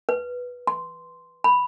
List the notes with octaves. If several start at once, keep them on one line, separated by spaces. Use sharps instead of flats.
B4
C6
B5